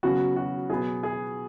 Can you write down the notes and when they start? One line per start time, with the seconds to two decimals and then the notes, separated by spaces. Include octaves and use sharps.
0.03 C#3 F#3 B3 F#4
0.36 F#4
0.70 B2 F#3 B3 G#4
1.03 G#4